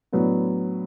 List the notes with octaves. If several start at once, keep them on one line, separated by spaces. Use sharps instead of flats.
A2 F#3 B3 D4